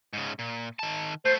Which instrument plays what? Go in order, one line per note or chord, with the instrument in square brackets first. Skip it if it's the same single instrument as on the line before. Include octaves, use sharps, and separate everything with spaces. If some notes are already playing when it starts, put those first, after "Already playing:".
[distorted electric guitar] G#2 C#3
A#2
D#3 A5
[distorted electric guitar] A3 B3 [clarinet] C5